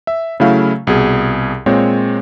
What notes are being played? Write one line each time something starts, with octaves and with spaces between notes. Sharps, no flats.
E5
C#3 F#3 A3 E4 F5
C2 B2 G#4
A#2 G#3 C4 C#5